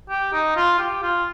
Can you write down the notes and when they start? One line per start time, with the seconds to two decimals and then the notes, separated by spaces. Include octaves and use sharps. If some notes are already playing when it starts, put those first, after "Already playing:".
0.10 G4
0.33 D#4
0.56 F4
0.79 G4
1.02 F4